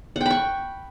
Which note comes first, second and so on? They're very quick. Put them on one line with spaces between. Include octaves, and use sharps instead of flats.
F#5 G5 B5 C#6